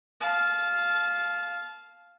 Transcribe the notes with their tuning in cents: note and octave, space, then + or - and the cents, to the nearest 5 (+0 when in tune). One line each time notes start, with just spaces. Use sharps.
F5 +0 A5 -25